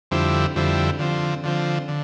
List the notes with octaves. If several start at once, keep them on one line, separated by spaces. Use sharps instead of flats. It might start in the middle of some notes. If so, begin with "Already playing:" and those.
F2 D3 G3 C4 E4
F2 D3 G3 C4 E4
D3 F3 C4
D3 F3 C4
D3